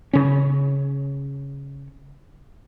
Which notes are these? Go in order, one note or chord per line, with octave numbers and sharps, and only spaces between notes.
C#3 C#4